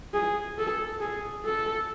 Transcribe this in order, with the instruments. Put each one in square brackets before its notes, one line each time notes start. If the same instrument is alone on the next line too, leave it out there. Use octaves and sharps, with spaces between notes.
[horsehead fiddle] G#4
A4
G#4
A4